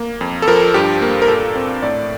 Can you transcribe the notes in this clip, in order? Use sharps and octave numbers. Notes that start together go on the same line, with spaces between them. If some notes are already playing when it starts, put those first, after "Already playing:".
Already playing: A#3
F2
A4
F3 A#4
G2 G4
A#3
A#4
A#2 A4
C4
A2 D5